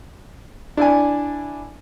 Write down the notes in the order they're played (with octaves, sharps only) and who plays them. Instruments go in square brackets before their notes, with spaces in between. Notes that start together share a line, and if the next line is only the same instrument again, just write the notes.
[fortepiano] D4 E4 D5 G#5